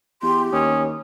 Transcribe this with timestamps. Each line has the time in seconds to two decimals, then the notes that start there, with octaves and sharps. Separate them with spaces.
0.22 E2 G4 C6
0.52 D#2 C#4 D#6